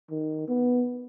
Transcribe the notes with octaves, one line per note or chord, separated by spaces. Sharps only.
D#3
B3